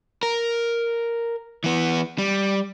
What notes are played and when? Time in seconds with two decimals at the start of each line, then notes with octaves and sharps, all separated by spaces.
0.23 A#4
1.64 E3 B3
2.18 G3